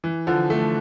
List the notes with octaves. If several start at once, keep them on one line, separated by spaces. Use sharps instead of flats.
E3
D3 F3
F3 A3